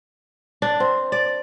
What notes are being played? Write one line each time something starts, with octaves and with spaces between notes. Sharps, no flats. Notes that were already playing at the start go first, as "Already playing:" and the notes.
D4
C4
D5